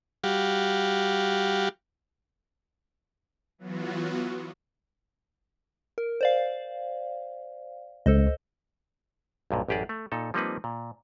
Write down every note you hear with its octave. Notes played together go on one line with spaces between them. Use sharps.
G3 F#4 G4 F5
E3 F#3 B3 F4 F#4
A#4
C5 D5 F5
C#2 A4 C5 D#5
B1 G2 A#2
A1 F#2 G4 G#4 D5
A3
A#2 D#4 A4
F3 G3 A#3 C4 D#4 B4
A#2